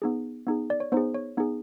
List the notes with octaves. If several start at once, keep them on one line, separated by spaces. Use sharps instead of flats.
B3 D#4 G#4
B3 D#4 G#4
D5
C#5
B3 D#4 G#4 C5
C#5
B3 D#4 G#4